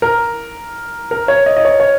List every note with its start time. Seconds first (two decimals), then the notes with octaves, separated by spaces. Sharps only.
0.02 A#4
1.11 A#4
1.28 C#5
1.46 D#5
1.56 D#5
1.65 C#5
1.80 C#5